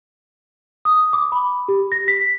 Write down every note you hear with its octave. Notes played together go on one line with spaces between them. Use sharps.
D#6
D6
B5
G4
A#6
B6